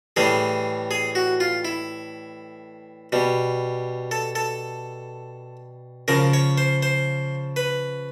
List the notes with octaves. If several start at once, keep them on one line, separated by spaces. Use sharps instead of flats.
A2 E3 G3 G#4
G#4
F#4
F4
E4
B2 G3
A4
A4
C#3 F3 A#4
C#5
C5
C5
B4